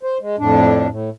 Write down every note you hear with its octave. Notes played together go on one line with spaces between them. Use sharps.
C5
G#3
F2 A2 D4
A2